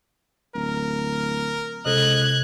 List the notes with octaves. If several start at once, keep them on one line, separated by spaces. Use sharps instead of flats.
D1 A#4
C#2 C3 A4 D#5 F#6 G#6